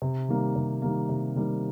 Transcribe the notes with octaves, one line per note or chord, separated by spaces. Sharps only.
C3
D#3 G3 A#3
C3
D#3 G3 A#3
C3
D#3 G3 A#3